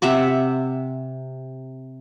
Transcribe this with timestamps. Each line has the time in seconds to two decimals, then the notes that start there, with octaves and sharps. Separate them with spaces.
0.02 C3 E5 F#5 D6